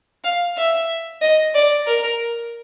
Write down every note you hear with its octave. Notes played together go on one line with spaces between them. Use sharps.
F5
E5
D#5
D5
A#4